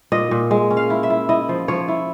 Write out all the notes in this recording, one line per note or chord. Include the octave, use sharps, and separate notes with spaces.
A#2 D#5
A#2
G#3
C#4
F5
E4
E5
E4
E4 D#5
F3
F3 C#5
E4